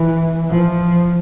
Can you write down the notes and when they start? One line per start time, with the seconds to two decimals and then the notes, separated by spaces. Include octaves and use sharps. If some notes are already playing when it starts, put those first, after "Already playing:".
Already playing: E3
0.50 F3